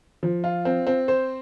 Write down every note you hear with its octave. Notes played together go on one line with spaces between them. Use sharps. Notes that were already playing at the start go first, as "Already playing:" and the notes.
F3
F4
C4
C4
C5